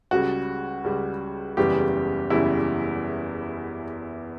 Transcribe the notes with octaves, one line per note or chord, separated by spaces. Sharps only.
C#2 C#3 G3 F#4
C#2 C#3 G3
F#1 E2 C#3 E3 G3 G4
F#1 E2 C#3 E3 G3 E4